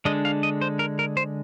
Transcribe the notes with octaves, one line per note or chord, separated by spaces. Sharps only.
D3 G#3 D4 D#5
F5
D#5
C5
A#4
A#4
C5